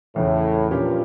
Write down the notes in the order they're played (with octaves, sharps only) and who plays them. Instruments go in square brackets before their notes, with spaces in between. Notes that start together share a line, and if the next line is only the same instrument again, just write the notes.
[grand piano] E2 C#3 E3 [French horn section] A2
[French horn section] G2 [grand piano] A#2 F3 C#4 G4 A#4